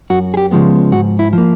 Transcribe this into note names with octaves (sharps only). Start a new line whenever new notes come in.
F#2 F#4
G#4
G4
C#3 F3 G#3 B3
G#2 F#4
E4
F3 A#3